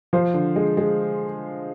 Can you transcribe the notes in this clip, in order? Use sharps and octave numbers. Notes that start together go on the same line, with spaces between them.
F3 C5
D3
G#3
G#3